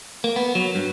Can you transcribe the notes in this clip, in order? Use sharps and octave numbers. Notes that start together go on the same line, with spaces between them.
A#3
B3
F#3
G2